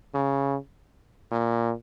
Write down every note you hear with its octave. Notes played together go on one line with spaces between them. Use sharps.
C#3
A#2